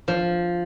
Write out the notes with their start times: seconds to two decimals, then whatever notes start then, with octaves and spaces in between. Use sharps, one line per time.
0.08 F3